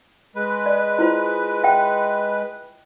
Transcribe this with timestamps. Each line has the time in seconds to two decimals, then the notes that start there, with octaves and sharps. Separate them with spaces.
0.35 G#3 B4
0.66 D5
0.99 E4 F4 C5
1.64 E5 G5